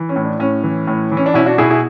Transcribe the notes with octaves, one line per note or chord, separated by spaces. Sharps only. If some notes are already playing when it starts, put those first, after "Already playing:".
Already playing: E3
C#4
A2
D4
A2 C#4
E3
A2
E3
C#4
D4
B2 C#4 E4
D4 F#4
B2 E4 G#4
E4 G#4